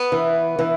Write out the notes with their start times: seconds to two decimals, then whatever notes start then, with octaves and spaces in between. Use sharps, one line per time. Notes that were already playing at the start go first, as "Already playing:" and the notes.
Already playing: B3
0.12 E3
0.59 E3